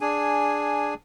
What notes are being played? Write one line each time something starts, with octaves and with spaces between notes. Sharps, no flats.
D4 G#4 G#5